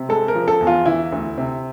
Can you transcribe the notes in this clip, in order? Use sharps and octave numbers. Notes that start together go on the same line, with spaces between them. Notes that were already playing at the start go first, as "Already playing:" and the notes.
Already playing: C3
G#3 A4
A#4
F3
A4
E2
F4
E3 E4
D2
C3